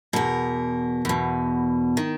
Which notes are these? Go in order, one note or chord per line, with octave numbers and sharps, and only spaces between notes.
E2 B2 A#4
E2 B2
D#3